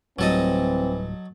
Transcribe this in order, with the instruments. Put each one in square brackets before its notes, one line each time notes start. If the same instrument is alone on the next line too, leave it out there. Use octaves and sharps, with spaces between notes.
[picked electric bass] D1 A2 G3 [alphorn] E3 [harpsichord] F#3 A4 D#5 [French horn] C4